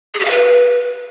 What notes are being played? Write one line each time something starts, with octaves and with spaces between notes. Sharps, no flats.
G#4
G4
F5
B4